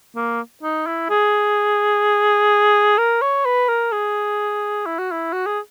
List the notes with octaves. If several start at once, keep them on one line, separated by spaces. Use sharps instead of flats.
A#3
D#4
E4
G#4
A#4
C#5
B4
A#4
G#4
E4
F#4
E4
F#4
G#4